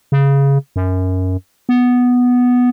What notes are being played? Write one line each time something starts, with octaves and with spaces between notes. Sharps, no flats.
C#3
F#2
B3